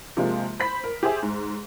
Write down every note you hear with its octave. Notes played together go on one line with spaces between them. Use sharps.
C3 F3 G#3 A#3
C5 B5 B6
A#4
G4 G#4 C5 E5
G#2